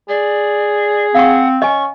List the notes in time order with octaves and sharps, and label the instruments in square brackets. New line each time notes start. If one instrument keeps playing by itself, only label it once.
[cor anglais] G#4 [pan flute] D5
[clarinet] C4 [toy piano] F5 C#6 [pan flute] F#5
[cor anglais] C#4 [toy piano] D#5 G#5 [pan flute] C#6